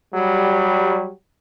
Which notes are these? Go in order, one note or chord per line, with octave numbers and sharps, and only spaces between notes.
F#3 G3